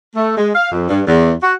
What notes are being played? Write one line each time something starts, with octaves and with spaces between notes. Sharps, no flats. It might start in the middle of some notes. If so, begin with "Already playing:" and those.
A3
G#3
F5
F2
G2
E2
F#4